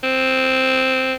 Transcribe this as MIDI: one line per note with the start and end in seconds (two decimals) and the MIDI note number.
0.04 1.14 60